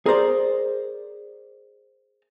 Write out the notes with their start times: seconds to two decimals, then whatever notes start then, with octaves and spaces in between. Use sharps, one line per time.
0.06 G#4 A#4 C5 D5